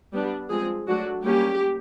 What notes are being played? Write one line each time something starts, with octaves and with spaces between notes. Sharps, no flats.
G3 B3 D4
F3 G#3 C4 G#4
F#3 A3 D4 F#4
G3 A#3 C#4 G4